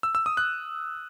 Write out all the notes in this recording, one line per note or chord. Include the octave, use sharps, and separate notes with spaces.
E6
E6
D#6
F#6